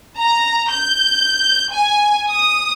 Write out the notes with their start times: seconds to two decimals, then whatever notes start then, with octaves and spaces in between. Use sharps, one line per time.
0.18 A#5
0.73 G6
1.73 G#5
2.31 D#6